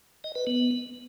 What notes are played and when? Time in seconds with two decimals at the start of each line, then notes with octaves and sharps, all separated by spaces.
0.24 D#5
0.35 B4
0.47 B3